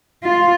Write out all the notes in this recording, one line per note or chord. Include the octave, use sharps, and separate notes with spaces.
F4